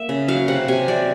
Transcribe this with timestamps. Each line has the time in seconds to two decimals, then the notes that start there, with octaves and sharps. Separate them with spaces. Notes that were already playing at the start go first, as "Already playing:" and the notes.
Already playing: A#3 E5
0.09 C#3
0.28 F#3 F5
0.48 C3 F#5
0.68 C3 G#5
0.88 F#3 D5